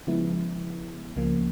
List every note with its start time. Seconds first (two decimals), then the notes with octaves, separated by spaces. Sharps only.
0.07 C#3 F3 G#3 B3 E4
1.16 C#2 C#3 F3 A#3